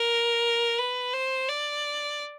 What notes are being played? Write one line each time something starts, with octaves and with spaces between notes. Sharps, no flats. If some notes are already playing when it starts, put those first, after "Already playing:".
Already playing: A#4
B4
C5
D5